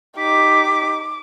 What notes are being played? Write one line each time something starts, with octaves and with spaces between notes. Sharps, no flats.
D#4 G4 D6 B6